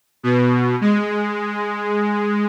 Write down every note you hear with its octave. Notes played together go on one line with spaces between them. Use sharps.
B2
G#3